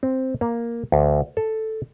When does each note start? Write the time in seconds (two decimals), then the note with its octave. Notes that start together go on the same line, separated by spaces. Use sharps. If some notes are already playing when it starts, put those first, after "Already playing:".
0.03 C4
0.41 A#3
0.92 D2
1.37 A4